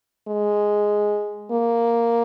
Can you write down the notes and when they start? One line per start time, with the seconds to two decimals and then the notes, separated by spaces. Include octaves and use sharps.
0.28 G#3
1.51 A#3